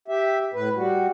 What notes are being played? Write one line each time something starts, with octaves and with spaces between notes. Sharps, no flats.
G4 E5
A2 B4
G3 F#4